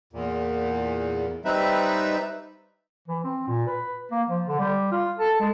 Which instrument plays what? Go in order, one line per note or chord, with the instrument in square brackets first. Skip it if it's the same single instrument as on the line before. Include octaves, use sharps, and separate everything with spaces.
[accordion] E2 A#2
G3 C4 D#4 B4 E5
[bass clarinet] E3
C4
A#2
B4
A#3
F3
D3
G3
F4
A4
G#3